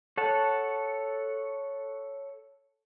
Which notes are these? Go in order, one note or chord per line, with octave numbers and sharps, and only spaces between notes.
A4 C#5 F#5 A5